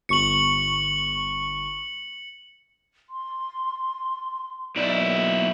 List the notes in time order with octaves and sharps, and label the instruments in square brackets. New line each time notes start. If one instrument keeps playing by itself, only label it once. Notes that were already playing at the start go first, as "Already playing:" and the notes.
[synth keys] G1 C#6 [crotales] C#7 F#7
[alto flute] C6
[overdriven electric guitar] B1 E4 [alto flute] D5
[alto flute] A#3